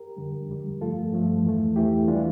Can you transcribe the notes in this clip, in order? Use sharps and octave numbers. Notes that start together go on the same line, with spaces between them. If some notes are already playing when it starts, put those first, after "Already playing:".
Already playing: G4 A#4
F2 D3 G3
F2 D3 G3
G2 F3 A3 F4 A4
G2 F3 A3
E2 E3 A3
E2 E3 A3 E4 G4
E3 G3 D4 F4